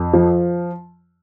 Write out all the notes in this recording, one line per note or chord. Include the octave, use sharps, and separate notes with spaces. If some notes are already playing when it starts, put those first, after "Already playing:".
Already playing: F2
F3